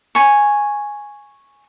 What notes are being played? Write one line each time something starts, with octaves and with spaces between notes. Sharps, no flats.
G#5 C#6